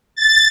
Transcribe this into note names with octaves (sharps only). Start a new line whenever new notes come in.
A6